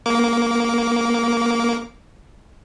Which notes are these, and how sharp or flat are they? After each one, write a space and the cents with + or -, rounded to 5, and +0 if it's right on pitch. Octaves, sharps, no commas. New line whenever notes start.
A#3 +10 D6 -25